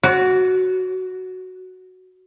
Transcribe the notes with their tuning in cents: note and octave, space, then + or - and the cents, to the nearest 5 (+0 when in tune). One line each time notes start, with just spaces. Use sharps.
F#4 +0 D5 -45